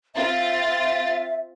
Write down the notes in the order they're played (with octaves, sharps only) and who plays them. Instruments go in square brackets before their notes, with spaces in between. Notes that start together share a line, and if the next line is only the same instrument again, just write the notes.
[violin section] C4 F4 A6 [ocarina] E5